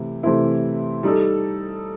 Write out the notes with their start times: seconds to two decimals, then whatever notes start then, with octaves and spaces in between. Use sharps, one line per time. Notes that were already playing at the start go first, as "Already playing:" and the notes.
Already playing: C3 E3 A3 E4
0.23 C3 E3 A3 C4 E4
1.03 G3 D#4 A4